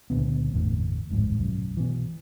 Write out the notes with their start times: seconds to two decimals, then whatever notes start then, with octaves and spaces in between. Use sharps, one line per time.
0.10 C#2 A#2 D3 B3
0.54 G1 E2 A2 D3
1.10 D1 G#1 F2 G#2
1.38 B1 F#2
1.77 B2 E3